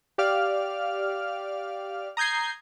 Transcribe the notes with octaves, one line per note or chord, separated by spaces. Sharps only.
G4 D5 F5 F6
A#5 D#6 G6 G#6 C7